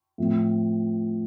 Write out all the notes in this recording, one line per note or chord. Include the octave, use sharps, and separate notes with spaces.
A2 F3 C4